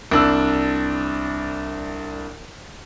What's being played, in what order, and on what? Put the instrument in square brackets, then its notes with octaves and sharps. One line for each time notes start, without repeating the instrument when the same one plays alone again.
[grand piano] C2 D4 E6